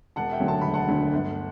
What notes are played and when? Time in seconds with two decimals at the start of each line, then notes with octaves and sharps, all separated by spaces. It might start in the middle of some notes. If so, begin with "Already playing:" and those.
0.16 E1 F#5 A5
0.32 E5 G5
0.40 D2 D3 F#3 A3
0.48 A5
0.61 E1 B5
0.74 F#5 A5
0.88 D2 D3 F#3 A3
1.13 G1